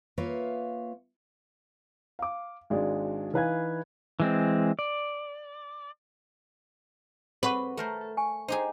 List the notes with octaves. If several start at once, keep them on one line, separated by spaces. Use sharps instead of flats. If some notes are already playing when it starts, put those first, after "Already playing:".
A#3 F4 B4 C#5 E5 F5
F5 D6
G#1 G#3 D4 F#4 D5
E3 D#4 B4 F5 G#5 G#6
E3 G#3 C4
D5
C4 G#4 B4 F#5 C#6
A3 A4 A#4 C5
A4
G#5 C#6
D#4 G4 G#4 C5